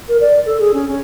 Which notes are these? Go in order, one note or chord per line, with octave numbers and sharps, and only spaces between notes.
A#4
D5
A4
G#4
C#4
C#4